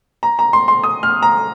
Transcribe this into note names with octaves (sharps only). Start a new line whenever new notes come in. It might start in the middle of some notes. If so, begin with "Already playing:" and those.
A#5
A#5
C6
C6
D#6
F6
A#5